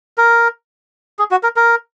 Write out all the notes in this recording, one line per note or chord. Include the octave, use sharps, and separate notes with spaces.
A#4
G#4
F#4
A#4
A#4